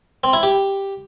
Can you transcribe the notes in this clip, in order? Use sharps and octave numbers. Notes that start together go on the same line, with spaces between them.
C4
E4
G4